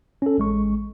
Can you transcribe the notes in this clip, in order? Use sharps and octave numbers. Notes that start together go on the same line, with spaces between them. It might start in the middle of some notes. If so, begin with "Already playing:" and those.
C#4 A4
A1 G#3 C#6